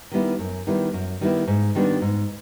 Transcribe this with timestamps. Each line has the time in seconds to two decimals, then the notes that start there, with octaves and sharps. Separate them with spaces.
0.11 D#3 G3 B3 E4
0.39 F#2
0.67 D#3 G3 B3 E4
0.93 F#2
1.21 D#3 G3 B3 E4
1.47 G#2
1.75 D#3 G3 B3 D4
2.02 G#2